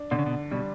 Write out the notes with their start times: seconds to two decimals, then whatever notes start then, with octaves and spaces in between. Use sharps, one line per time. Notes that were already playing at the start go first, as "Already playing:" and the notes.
Already playing: D4
0.11 B2 D3
0.19 C#3
0.26 B2
0.51 B2 G3